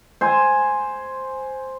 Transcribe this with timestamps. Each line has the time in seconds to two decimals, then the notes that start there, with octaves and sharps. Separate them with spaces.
0.21 C5 G#5